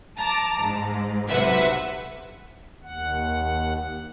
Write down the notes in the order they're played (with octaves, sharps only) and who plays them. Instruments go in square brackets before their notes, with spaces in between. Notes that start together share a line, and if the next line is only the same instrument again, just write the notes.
[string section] A5 A#5 D6
G#2
B1 C3 B4 E5 F#5
[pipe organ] D#2 F#5